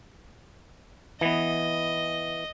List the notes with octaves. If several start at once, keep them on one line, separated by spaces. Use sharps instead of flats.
E3 B3 D#5